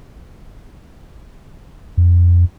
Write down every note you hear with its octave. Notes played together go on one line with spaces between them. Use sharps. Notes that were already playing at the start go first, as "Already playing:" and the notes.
F2